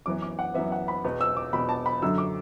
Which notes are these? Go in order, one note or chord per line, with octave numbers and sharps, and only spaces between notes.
F#2 E3 B3 D6
D6
F#5
F#2 E3 B3 E5
F#5
B5
E2 B2 B3
E6
D6
E2 B2 B3 B5
A5
B5
F#2 D3 F#3 E6
D6